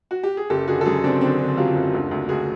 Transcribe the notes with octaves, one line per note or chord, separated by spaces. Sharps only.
F#4
G4
G#4
F#1 G4 A4
D3 F#4 G#4
A4
F#2 F#4 G#4
F#1 C4 D4
D3 C4 D4
D3
F#3 F4 G4
F#1
D2
D2
D2 F#4 G#4